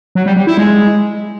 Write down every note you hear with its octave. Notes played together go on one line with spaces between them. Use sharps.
F#3
G3
G3
E4
G#3